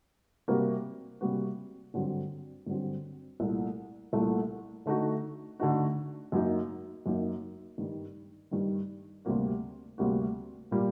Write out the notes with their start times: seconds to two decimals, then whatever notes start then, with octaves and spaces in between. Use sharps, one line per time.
0.48 C3 G3 A#3 F#4 A#4
1.21 C3 G3 A#3 F#4 A#4
1.94 G2 D3 F#3 C4
2.66 G2 D3 F#3 C4
3.40 C2 A#2 A3
4.12 C2 A#2 A3
4.86 D3 A3 D#4 F#4
5.60 D3 A3 D#4 F#4
6.32 F#2 F#3 A#3 D#4
7.06 F#2 F#3 A#3 D#4
7.78 G2 D#3 G3
8.51 G2 D#3 G3
9.25 D2 C3 G3 A#3 F#4
9.98 D2 C3 G3 A#3 F#4
10.71 A#2 G3 A#3